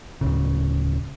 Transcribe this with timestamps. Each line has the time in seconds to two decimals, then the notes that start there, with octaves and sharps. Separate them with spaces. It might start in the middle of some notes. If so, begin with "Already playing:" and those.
0.21 D1 G#1 C#3